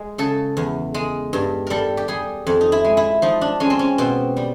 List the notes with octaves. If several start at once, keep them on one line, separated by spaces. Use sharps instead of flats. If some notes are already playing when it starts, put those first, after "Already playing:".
Already playing: G#3
C#3 A4
E2
G#3
G2
G3 A4 A#4
G4
G3 G#4
F2
D#4
E4
G#3
E4
F3 D#4
D4
G#3 C#4
C4
C#4
B2 C4
G3